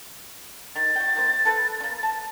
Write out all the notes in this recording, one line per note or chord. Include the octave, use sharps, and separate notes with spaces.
D#3 A6
F#4 G5
D#3 A#3 C5
A4 B4
A#3 C#4
A5